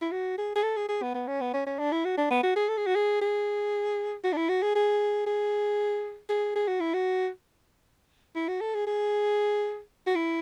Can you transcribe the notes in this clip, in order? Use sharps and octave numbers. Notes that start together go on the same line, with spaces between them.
E4
F#4
G#4
G#4
A4
G#4
G#4
B3
B3
C#4
B3
C#4
C#4
D4
E4
F#4
D4
B3
F#4
G#4
A4
G#4
F#4
G#4
G#4
F#4
D4
E4
F#4
G#4
G#4
G#4
G#4
G#4
F#4
E4
F#4
E4
F#4
A4
G#4
G#4
F#4
E4